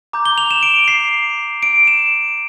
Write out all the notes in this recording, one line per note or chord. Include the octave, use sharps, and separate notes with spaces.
A#5 D6 G6
G7
F7
E7
D7
C7
D7
E7